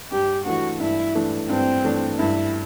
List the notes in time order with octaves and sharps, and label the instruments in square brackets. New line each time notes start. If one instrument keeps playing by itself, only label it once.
[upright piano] G2 [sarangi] G4
[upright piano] E3 A3 D4 [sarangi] F#4
[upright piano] G2 [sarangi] E4
[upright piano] E3 A3 D4
[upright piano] G2 [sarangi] C4
[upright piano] E3 A3 D4
[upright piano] G2 [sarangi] E4